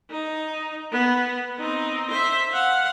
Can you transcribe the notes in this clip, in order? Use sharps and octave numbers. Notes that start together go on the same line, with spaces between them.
D#4
B3
C4 D#4
C5 E5
F5 F#5